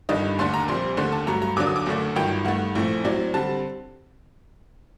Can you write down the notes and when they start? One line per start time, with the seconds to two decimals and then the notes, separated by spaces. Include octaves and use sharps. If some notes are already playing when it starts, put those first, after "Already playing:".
0.09 G1 G2 D#3 G3 D4 D#5
0.39 D#2 D3 A3 D4 C6
0.54 A#5
0.68 A#1 A#2 G3 C4 C6
0.97 D#2 D3 A3 D4 C6
1.12 A5
1.27 G2 F#3 A3 A#5
1.42 A#5
1.56 D#2 D3 F#3 A#3 D4 D6
1.67 D#6
1.76 D6
1.86 F#1 F#2 D3 A3
2.16 G1 G2 D#3 F#3 G5
2.45 G2 D#3 A3 F#5
2.75 A#1 A2 A3 C4
3.04 A2 F#3 C4 D5
3.34 D3 G3 C4 A5